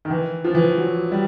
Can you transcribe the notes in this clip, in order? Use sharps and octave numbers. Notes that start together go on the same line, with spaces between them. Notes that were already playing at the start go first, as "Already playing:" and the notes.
D#3
E3
F3
E3
F3
F#3
G3